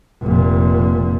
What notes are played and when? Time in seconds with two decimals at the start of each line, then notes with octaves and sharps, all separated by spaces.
0.23 F1 A#2